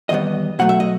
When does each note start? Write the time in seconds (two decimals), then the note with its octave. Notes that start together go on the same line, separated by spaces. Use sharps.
0.09 E2 D#3 G3 B3 D#5
0.59 B2 F#3 A3 F#5
0.69 E5
0.80 D#5